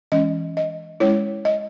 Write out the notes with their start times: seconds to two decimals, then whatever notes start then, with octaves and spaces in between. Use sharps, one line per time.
0.12 E3 G#3 C#4 D#5
0.57 D#5
1.00 G#3 C#4 E4 C#5
1.45 D#5